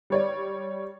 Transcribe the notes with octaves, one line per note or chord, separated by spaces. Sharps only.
G3 C#5 D5